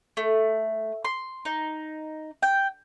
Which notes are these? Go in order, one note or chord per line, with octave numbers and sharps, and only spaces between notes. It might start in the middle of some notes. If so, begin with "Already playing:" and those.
A3
C6
D#4
G5